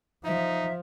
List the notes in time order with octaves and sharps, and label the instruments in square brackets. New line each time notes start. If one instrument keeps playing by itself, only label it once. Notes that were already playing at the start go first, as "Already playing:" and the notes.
[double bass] F3 [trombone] D#4 [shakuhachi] E5